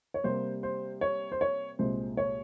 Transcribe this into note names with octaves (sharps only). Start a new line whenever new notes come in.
C#5
C3 G3 A#3 C5
C5
C#5
C5
C#5
C2 A#2 G#3 C5
C#5